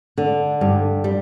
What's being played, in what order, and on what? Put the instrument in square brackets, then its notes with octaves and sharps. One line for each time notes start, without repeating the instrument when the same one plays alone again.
[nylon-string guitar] D3
G2
G3